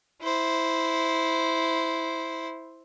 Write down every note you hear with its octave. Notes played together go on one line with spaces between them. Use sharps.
E4 C5